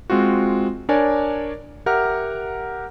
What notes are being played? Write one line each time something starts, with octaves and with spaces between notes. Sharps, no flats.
G#3 C4 F4 F#4
D4 A#4 C#5 D5 G#5
G4 A#4 E5 F#5 A#5 F6